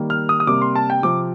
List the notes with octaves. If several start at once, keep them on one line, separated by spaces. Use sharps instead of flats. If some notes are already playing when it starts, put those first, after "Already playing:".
Already playing: D#3 G3 A#3
F6
D#6
D#6
C3 G3 A#3 D6
C6
A5
G5
C3 F3 C4 D6